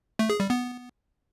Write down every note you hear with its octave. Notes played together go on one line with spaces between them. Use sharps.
A3
G#4
G3
B3